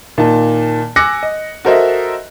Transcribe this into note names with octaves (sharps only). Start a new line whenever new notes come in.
A#2 D#3 A5
G#5 D6 E6 F#6 A#6 C#7
D#5
F#4 A4 A#4 C5 D#5 E5